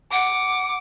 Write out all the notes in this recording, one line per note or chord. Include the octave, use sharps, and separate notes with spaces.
F#5 D6